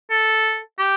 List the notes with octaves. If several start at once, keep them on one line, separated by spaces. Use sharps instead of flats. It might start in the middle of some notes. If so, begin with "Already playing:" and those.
A4
G4